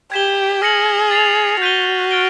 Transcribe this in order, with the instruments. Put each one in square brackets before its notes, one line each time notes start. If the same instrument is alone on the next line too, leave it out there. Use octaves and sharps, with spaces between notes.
[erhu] G4 [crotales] G#6 B6 E7 G7
[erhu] G#4 [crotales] F6 A#6 C#7 F#7
[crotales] A6 C7 F7
[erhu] F#4 [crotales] G6 B6 D#7 G7
[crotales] F6 A6 D7 G7